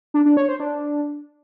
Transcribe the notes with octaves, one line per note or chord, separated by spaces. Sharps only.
D4
D4
C#5
C5
D4